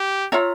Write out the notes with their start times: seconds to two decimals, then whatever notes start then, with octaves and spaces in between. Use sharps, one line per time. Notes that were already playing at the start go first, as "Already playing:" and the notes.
Already playing: G4
0.32 F4 C#5 E5 A#5